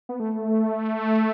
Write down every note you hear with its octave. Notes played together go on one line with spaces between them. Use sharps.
B3
A3